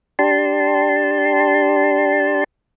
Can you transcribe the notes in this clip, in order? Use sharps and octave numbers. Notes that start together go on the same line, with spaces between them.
D4 G4 A5 C6